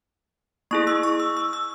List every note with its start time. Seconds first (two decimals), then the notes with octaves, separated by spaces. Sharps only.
0.71 A#3 E4 G#4 C#6
0.87 E6
1.03 C#6
1.20 E6
1.37 E6
1.53 E6